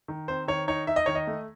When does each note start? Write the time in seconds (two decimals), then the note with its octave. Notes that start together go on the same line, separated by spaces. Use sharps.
0.08 D#3
0.28 C4 C5
0.48 D#3 C#5
0.68 D#4 C#5
0.87 D#4 E5
0.96 D#5
1.06 D#3 C#5
1.15 D#5
1.27 A3